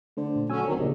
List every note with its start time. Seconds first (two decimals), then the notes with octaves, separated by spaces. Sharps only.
0.17 D3 A3 C5 D5
0.36 A#2
0.50 D3 F#3 C#4 G#5 E6
0.66 D1 D#3 F#3 C4 D4
0.79 A#1 A#2 C#3 G4 G#4 D#5